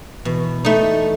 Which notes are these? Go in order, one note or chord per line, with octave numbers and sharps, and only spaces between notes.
B2 E3
A3 D#4